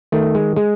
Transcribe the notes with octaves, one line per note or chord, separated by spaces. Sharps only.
D#3 A3
G#3
G#3